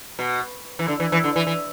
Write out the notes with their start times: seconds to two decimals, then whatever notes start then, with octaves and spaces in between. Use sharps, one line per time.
0.19 B2
0.79 E3
0.88 D3
1.00 E3
1.12 E3
1.24 D3
1.36 E3
1.47 E3